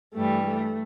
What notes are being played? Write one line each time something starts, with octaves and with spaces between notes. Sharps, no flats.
G2 E3 G3 A3
A3